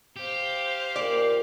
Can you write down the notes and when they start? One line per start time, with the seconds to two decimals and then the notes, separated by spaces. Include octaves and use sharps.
0.16 G4 C5 F5
0.96 A#2 D5